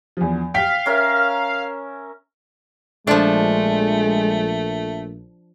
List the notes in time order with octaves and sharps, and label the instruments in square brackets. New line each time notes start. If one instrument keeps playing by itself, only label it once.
[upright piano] E2 F3
[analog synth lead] F5 [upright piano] G5 B6
[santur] C#4 A#4 E5
[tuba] A#1 [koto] F3 D4 [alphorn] G#3 [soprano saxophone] A3